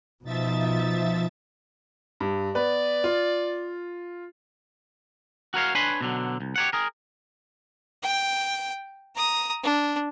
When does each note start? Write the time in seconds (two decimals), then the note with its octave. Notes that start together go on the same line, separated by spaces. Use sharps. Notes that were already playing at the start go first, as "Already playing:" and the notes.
0.24 B2 F3 D#4 E5 A6
2.20 G2
2.55 B3 B4 D5
3.04 F4
5.54 F#4 A#4 C#5 F5
5.75 D4 B4 C#5 G#5 B5 C6
6.01 B2 D3 F#3
6.40 C2
6.56 G4 C#5 F#5
6.73 G#4 A#4
8.03 G5
9.15 A#5 D#6
9.64 D4